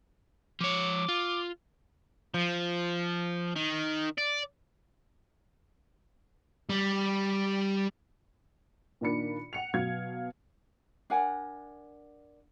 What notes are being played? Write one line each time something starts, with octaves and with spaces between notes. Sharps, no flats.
F3 C#5 D6
F4
F3
D#3
D5
G3
A#2 D#3 A#3 D4 B5 C#7
F#5 C#7 F7
B2 F#3 F5 G#6
D4 A#4 F#5 G#5